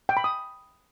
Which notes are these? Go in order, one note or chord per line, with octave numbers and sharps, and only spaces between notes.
G5
B5
D#6